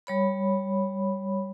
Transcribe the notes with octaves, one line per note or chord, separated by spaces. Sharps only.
G3 C#5 B5